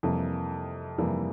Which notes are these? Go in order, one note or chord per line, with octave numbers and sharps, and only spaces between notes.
F2 C3 E3 G3 A#3
F2 C3 E3 G3 A#3